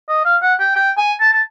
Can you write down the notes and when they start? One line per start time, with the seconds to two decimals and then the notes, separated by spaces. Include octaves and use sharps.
0.09 D#5
0.25 F5
0.42 F#5
0.59 G5
0.76 G5
0.98 G#5
1.20 A5
1.33 A5